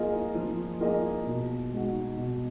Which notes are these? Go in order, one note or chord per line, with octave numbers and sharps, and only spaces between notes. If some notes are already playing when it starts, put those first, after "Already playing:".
Already playing: F3 A#3 F4 G#4 D#5
F3
A#3 F4 G#4 D#5
B2
G#3 D#4 F#4
B2